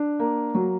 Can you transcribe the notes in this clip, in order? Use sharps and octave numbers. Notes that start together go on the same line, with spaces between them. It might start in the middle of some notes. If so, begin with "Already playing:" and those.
Already playing: D4
A#3
F#3